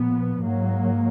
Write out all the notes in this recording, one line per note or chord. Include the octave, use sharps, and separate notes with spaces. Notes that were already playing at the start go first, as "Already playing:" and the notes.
Already playing: A#2 F3 B3
G#2 F#3 A#3